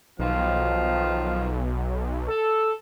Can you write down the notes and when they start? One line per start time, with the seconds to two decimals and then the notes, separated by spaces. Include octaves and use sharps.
0.19 B1 D#3 F3 F5
2.28 A4